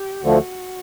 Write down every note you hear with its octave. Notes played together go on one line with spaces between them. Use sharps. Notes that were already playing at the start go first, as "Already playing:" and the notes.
Already playing: G4
D2 D3 F3 A3 F#4